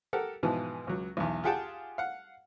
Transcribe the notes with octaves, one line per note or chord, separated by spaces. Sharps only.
G4 A4 A#4 F#5
G#2 B2 E3 F3
C#2 F#3
B1 E2
F4 G4 G#4 F#5 G5 A5
F5 F#5